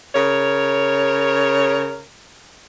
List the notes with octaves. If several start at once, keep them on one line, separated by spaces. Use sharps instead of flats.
C#3 A#4 C#5